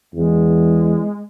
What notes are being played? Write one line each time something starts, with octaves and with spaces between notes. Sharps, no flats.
E2 G#3